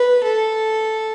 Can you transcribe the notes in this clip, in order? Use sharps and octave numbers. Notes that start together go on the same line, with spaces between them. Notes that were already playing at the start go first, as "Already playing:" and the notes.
Already playing: B4
A4